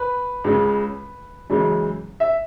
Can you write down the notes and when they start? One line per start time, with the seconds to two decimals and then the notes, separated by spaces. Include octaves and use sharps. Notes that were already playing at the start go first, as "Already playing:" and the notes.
Already playing: B4
0.44 C#2 C#3 G#3
1.50 F#2 C#3 E3 G#3
2.20 E5